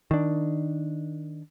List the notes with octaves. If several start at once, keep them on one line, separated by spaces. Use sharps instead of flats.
D#3 D4